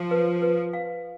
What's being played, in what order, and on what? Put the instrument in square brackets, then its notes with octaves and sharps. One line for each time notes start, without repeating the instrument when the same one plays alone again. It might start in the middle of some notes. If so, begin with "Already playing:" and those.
Already playing: [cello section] F3
[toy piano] B4
B4
F5